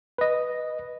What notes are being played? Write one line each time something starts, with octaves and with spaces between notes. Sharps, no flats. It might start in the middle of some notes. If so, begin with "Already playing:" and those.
B4 D#5